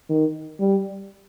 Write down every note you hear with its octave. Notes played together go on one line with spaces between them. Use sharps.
D#3
G3